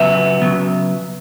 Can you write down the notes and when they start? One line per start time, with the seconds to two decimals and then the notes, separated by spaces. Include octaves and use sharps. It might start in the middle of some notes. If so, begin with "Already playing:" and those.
Already playing: C#3 F#3 B3 E5
0.42 C#3 F#3 B3